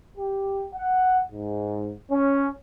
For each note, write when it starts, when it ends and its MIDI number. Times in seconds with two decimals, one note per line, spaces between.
0.17 0.65 67
0.72 1.19 78
1.32 1.92 44
2.11 2.46 61